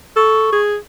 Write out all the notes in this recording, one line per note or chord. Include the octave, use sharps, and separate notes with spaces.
A4 C#6
G#4